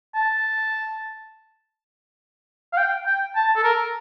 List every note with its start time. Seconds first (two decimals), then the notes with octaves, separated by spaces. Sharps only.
0.15 A5
2.73 F5
2.78 G5
3.06 G5
3.36 A5
3.56 A4
3.64 A#4